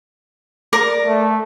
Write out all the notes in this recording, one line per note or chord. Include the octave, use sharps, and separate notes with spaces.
A#4 D5 D6
A3